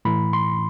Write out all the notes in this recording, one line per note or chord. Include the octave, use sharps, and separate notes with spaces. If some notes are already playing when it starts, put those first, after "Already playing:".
A2 E3 B5
C6